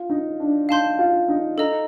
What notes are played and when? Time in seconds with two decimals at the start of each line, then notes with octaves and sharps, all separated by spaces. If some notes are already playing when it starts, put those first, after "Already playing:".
Already playing: F4
0.10 D#4
0.40 D4
0.69 D#4 F5 A5 C6 G6
0.99 F4
1.28 D#4
1.58 D#4 A4 D#5 A#5